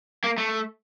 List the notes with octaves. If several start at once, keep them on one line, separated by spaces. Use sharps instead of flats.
A#3
A3